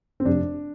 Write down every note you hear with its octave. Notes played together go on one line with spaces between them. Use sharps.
C4
F1 F2 C3 D4